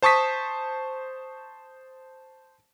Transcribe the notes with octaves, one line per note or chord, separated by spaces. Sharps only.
C5 A5 C#6 D#6 B6